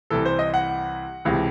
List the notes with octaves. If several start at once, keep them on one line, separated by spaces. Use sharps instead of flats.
C2 C3 E3 A4
C5
D#5
F#5
C#2 C3 E3